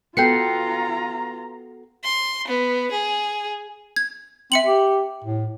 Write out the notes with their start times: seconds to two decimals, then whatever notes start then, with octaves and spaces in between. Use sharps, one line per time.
0.17 B3 F4 F#4 A4 G5 A#5 C7 C#7
2.04 C6
2.48 B3
2.92 G#4
3.96 G#6
4.52 C4 E5 C#7 F#7
4.66 G4
5.24 A2